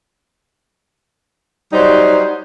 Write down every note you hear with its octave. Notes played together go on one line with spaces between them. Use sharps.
F#3 G3 D#4 C5